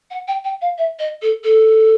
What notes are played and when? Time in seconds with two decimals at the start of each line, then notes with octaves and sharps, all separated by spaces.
0.11 F#5
0.28 G5
0.44 G5
0.62 F5
0.78 E5
0.99 D#5
1.22 A4
1.44 A4